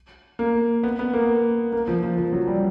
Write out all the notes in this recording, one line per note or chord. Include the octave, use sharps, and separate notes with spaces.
A#3
B3
B3
A#3
A#3
F3
F3
F3
F#3
G3